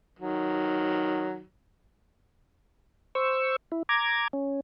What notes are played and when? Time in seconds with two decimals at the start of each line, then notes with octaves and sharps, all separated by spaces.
0.19 D#3 F#3
3.15 C5 C#6 E6
3.72 E4
3.89 A#5 D6 G#6
4.33 C#4